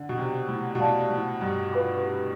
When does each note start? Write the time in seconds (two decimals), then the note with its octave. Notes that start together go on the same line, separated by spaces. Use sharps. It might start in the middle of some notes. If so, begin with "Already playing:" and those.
Already playing: D3
0.09 B2
0.18 C3
0.48 A2
0.75 B2
0.80 A2 G4 D5 F5 A5
1.10 A2
1.41 G2
1.72 F4 B4 F5 B5 D6